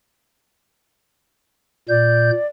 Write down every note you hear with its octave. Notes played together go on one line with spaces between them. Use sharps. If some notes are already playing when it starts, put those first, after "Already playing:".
A#2 D5 G6